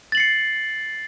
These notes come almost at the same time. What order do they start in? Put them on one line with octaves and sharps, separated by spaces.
A6 F#7 C7 C#7